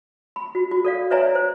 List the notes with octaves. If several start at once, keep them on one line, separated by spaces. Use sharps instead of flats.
B5
F#4
F#4
A4 D5 F5
B4 C#5 D5 E5 G#5 A#5
C5